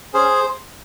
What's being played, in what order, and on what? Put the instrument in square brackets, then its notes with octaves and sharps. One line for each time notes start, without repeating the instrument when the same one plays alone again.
[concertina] C#4 G#4 C5